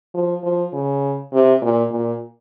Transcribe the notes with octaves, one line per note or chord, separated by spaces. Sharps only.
F3
F3
C#3
C3
A#2
A#2